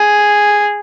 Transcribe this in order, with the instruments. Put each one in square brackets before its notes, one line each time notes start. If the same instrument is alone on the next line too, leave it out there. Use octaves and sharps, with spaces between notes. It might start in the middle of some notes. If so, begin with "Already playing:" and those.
Already playing: [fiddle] G#4